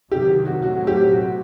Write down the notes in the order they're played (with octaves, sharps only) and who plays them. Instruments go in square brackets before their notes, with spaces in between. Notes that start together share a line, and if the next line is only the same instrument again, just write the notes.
[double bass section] C3 D#3 F#3 [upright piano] G4
[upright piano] F#4
[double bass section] A2 F#3 A3 C4 [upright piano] F#4
[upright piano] G4
[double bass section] C3 [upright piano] F#4